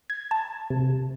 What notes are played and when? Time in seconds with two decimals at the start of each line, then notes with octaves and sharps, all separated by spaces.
0.10 G#6
0.31 A5
0.70 C3